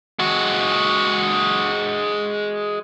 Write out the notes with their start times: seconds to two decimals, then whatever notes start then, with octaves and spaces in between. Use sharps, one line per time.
0.19 G#3 F#4